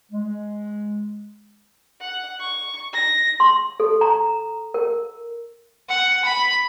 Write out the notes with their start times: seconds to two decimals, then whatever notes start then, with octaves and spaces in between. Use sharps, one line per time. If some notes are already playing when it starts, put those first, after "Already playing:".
0.12 G#3
2.01 F#5
2.40 C#6
2.93 A#6
3.40 C6
3.80 A4
4.01 A#5
4.74 A#4
5.89 F#5
6.25 B5